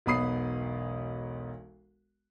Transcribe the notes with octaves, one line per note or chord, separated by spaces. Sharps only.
E1 B1 B3 B5 D#6 C7